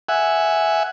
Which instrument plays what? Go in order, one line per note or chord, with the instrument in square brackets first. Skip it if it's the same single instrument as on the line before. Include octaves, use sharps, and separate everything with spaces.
[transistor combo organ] E5 F#5 G#5